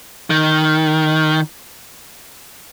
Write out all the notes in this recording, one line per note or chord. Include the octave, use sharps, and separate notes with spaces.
D#3